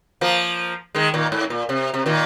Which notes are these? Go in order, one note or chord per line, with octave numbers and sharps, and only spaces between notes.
F3 A#3
D#3 G#3
A#2 D#3
G#2
A#2
C3
C3
A#2 D#3